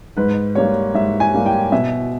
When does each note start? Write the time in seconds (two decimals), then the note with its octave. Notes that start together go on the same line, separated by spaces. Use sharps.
0.17 G#2 B4
0.55 G3 A#3 C#5
0.94 G#2 E5
1.20 G#5
1.34 G3 A#3
1.46 G5
1.72 B2 E5